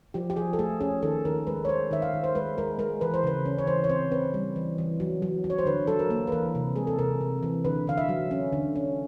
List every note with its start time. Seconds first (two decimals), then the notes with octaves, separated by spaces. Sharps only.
0.14 F3 G4
0.30 G4
0.36 F3 G#4
0.53 A4
0.59 A3 G#4
0.81 C#4 G#4
1.03 D#3 A4
1.25 D#3 A#4
1.47 G#3 B4
1.65 C#5
1.69 G#3 C5
1.91 D#3 E5
2.02 F5
2.14 D#3
2.24 C5
2.35 G#3 B4
2.58 G#3 A#4
2.79 G#3 A#4
3.01 E3 B4
3.14 C5
3.23 C#3 B4
3.46 C#4
3.58 C#5
3.67 E3 C5
3.84 C#5
3.89 C4 C5
4.11 C4 B4
4.34 G3
4.56 E3
4.78 E3
5.00 F#3
5.22 F#3
5.44 F#3
5.50 C#5
5.58 C5
5.66 D3 B4
5.88 F#3 A4
5.99 A#4
6.10 A#3
6.27 B4
6.32 E3 A#4
6.55 C3
6.76 G#3 G#4
6.87 A4
6.98 C3 A#4
7.21 C3
7.43 E3
7.65 D3 B4
7.87 D3 F5
7.98 E5
8.09 F#3
8.31 C#4
8.53 D3
8.76 C#4